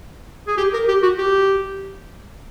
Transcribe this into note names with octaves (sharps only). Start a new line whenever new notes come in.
G#4
G4
A#4
G4
F#4
G4